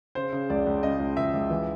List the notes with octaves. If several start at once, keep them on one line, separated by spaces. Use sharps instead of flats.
C#3 C5
C#3
C#2 D5
C#2
C#3 D#5
C#2
C#2 E5
C#2
E3